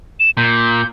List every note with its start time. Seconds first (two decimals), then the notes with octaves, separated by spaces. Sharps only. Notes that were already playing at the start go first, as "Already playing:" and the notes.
0.20 E7
0.37 A#2 G6